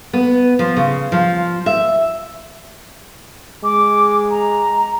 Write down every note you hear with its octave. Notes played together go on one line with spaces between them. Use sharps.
B3
F3
C#3
F3
E5
G#3 D6
A#5